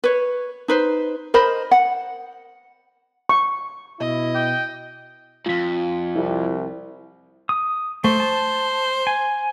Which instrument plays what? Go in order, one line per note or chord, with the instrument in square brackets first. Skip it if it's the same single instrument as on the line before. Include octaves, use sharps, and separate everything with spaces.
[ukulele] B4 C#5
D#4 B4 C5
A#4 C5 D#5 B5
F#5
[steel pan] C#6
[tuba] B2 [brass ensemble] E4 [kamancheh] D#5
[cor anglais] G5
[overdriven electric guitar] F2 G#2 [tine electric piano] F4 B6
[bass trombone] C2 [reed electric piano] E4 G4
[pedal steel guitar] D#6
[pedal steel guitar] A3 [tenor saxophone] C5
[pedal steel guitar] A5
G#5